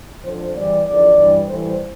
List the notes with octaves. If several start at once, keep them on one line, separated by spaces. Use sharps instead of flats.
F2 D3 F3 C5
E2 E3 G3 D5
E2 D3 F3 D5
G2 E3 G3
A2 E3 G3 C5